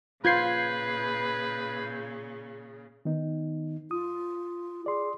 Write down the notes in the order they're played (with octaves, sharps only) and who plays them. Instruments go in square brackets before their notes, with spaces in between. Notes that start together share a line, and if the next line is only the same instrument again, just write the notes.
[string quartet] A#2 C#3 [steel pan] F4 [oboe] B4 [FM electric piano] G6 G#6 C7
[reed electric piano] D#3 B3 D#4
[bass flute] F4 [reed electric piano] D#6
[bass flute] G#4 [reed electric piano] D5 C6